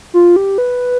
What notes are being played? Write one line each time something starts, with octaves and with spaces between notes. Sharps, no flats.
F4
G4
B4